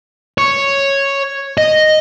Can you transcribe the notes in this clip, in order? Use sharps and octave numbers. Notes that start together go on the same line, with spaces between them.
C#5
D#5